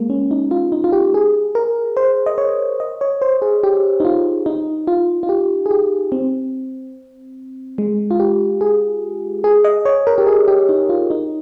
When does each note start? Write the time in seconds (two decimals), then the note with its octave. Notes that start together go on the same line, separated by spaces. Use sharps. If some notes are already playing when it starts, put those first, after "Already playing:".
Already playing: G#3 A#3
0.10 C#4
0.31 D#4
0.51 F4
0.72 D#4
0.84 F4
0.92 G4
1.14 G#4
1.55 A#4
1.97 C5
2.26 D#5
2.38 C#5
2.80 D#5
3.01 C#5
3.22 C5
3.42 G#4
3.63 G4
4.00 D#4
4.05 F4
4.46 D#4
4.87 F4
5.23 F4
5.29 G4
5.66 G#4
5.71 G4
6.12 C4
7.78 G#3
8.11 F4
8.20 G4
8.61 G#4
9.44 G#4
9.64 D#5
9.85 C#5
10.07 A#4
10.18 G4
10.27 G#4
10.48 G4
10.69 D#4
10.89 F4
11.10 D#4